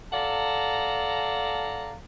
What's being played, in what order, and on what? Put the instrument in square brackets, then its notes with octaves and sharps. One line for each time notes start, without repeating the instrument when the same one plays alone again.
[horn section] A4 D5 F5 F#5 A5 A#5